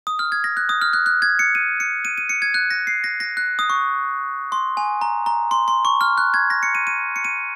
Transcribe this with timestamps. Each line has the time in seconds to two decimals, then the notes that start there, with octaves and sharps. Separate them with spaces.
0.07 D#6
0.19 F6
0.32 G#6
0.44 A#6
0.57 F#6
0.69 D#6
0.81 F6
0.93 F#6
1.06 F#6
1.22 G#6
1.39 C#7
1.55 D#7
1.80 C#7
2.05 D#7
2.18 D#7
2.29 C#7
2.42 G#6
2.54 F#6
2.71 A#6
2.87 C7
3.04 A#6
3.20 A#6
3.37 F#6
3.59 D#6
3.70 C#6
4.52 C6
4.77 G#5
5.01 A#5
5.26 A#5
5.51 C6
5.68 C6
5.85 C#6
6.01 F6
6.18 F#6
6.34 G#6
6.50 A#6
6.63 C#7
6.75 D#7
6.87 D#7
7.16 C#7
7.25 D#7